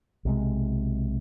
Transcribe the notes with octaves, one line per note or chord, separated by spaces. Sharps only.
B1 C3 G#3